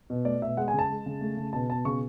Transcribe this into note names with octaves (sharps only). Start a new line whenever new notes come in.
B2
A3 D5
B2 E5
G#3 F#5
G#5
C#3
A5
G#3
C#3
A3
C#3
B2 A5
B2 A5
C#3 C#6